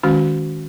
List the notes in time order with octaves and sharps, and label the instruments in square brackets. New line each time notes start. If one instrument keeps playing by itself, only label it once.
[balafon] D#3 G#3 C#4 F#4